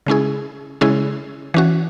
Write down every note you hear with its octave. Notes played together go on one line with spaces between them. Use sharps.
C#3 G#3 C#4 E4 G#4
C#3 G#3 C#4 E4 G#4
E3 C#4 F#4